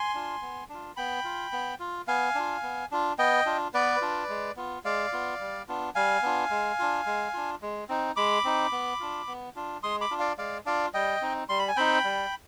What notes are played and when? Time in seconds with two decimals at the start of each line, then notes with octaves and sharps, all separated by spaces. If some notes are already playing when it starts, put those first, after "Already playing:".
Already playing: G#5 C6
0.14 D4 F4
0.42 B3
0.69 D4 F4
0.96 B3 G5 B5
1.25 F4
1.52 B3
1.80 F4
2.07 B3 F5 G#5
2.35 D4 F4
2.63 B3
2.91 D4 F4
3.19 B3 D#5 G5
3.46 D4 F4
3.74 B3 B4 D5
4.01 D4 F4
4.29 G#3
4.56 B3 F4
4.84 G#3 D5 F5
5.12 B3 F4
5.41 G3
5.68 B3 D4 F4
5.95 G3 F5 G#5
6.22 B3 D4 F4
6.50 G#3
6.79 D4 F4
7.06 G#3
7.33 D4 F4
7.62 G#3
7.89 C4 D#4
8.16 G#3 B5 D6
8.44 C4 D#4
8.72 B3
9.00 D4 F4
9.27 B3
9.56 D4 F4
9.83 G#3 C6 D#6
10.01 B5 D6
10.11 D4 F4
10.19 D5 F5
10.38 G#3 D5 F5
10.65 D4 F4 D5 F5
10.94 G3 D#5 G5
11.21 C4 D#4
11.49 G3 C6
11.59 B5
11.68 G#5
11.76 C4 D#4 G5 B5
12.04 G3